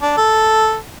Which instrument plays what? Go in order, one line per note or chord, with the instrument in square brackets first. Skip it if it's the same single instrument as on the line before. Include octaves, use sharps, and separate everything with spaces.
[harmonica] D4
A4